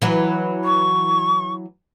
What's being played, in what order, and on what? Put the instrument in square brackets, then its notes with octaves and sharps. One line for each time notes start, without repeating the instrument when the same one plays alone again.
[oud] E3 F#3
[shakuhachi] C#6